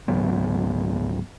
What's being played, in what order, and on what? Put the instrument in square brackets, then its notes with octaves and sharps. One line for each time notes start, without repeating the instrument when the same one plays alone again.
[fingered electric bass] C#2 G#2 F#3 B3